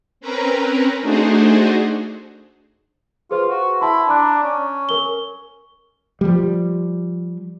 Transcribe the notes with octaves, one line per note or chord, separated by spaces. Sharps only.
C4 C#4 A#4 B4 A#5
A3 D4 D#4 F#4 G#4 C5
F4 G#4 B4 C5
F#4
E4 A5 C6
D4 A#5 D6 F#6
C#4
A#4 G7
F3 G3